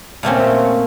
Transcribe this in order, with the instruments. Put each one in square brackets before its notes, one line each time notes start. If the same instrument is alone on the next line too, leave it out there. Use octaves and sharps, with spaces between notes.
[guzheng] A#2 A3 C4 C#4